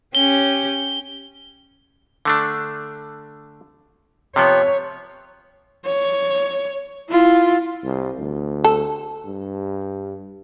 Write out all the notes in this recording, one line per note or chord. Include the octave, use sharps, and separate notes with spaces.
C#4 G4 G7
D3 A3 D4
C3 F3 B3 C#5
C#5
E4 F4
C2
D2
A4
G2